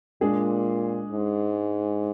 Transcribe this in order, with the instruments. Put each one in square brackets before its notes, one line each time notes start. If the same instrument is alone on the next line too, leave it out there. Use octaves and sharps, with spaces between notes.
[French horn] A#2 [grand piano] G#3 D4 G#4
[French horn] G#2